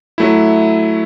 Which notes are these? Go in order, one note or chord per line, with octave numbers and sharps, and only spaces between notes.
F#3 A3 E4